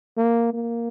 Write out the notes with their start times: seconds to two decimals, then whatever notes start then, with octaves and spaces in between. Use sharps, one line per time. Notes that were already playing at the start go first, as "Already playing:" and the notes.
0.17 A#3
0.53 A#3